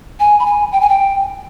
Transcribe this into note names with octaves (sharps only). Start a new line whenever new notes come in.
G#5
B5
G#5
G5
G#5
G5